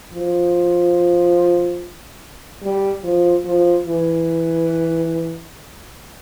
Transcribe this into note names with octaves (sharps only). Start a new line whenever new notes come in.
F3
G3
F3
F3
E3